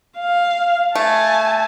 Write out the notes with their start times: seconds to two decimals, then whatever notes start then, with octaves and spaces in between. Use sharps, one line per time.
0.19 F5
0.95 A3 G#5 A5